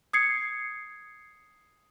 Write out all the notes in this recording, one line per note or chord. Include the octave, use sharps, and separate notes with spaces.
D#6 G#6 C7 C#7